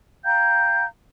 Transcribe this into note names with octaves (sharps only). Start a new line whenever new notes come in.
F5 G5 A#5 G6